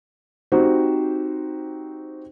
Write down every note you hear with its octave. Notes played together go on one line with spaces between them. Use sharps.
C4 D#4 F#4 G4 C5